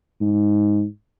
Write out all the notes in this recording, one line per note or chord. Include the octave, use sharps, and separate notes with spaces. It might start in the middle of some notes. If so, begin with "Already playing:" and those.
G#2